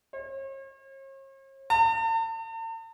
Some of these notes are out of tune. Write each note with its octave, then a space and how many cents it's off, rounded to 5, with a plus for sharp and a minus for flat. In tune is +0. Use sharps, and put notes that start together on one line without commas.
C#5 -45
A5 +45